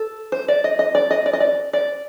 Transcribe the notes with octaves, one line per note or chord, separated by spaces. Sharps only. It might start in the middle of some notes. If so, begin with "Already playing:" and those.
Already playing: A4
C5
D5
D#5
D#5
D5
D#5
D5
D#5
D5
D5